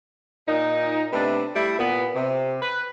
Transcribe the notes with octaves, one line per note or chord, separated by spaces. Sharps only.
A#2 D#4
C3 A3 B3 D4
G3 A3 E4
A#2 B3
C3
B4